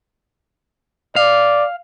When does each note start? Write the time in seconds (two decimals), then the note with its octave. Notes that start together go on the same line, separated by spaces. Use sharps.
1.16 D5 F5